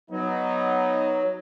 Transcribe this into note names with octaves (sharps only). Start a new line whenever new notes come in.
F#3 B3 D#4